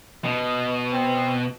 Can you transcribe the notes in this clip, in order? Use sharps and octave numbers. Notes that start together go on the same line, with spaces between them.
B2 D#5
C4